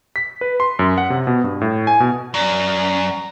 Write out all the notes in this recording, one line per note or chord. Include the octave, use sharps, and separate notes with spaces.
B6
B4
C6
F#2
F#5
C3
B2
G2
A2
G#5
B2
F#2 D5 A#5